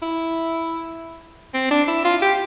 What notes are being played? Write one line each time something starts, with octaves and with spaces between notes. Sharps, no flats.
E4
C4
D4
E4
F4
G4